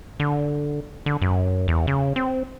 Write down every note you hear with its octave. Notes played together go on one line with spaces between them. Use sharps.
D3
D3
F#2
E2
C#3
C4